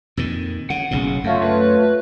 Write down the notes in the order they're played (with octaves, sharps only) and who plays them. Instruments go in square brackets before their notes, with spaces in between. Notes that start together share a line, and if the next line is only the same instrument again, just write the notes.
[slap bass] F2 A#2 D#3
[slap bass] C#3 [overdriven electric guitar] F#5
[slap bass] F#1 B1 A2 [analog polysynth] C#3
[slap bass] F#2 [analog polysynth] A3 F4 C#5
[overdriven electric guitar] B4